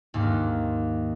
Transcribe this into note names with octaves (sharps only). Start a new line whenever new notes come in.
D#2 G#2 A#3